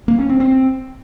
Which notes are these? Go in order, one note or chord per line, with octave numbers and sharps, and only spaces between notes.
A#3
C#4
C4
C4